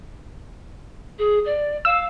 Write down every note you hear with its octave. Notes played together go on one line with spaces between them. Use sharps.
G#4
D5
F5 E6